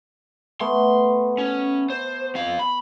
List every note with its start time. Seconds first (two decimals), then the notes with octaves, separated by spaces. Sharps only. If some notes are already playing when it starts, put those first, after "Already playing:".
0.61 A3 B3 C6
1.38 C#4
1.90 C5
2.35 C4 F5
2.59 B5